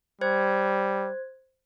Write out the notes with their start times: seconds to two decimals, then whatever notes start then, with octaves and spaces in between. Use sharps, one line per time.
0.21 G3 C5 G#6